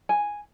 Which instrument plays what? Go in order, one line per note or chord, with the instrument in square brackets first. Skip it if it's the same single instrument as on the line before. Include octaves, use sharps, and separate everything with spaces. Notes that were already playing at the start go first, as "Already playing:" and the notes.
[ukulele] G#5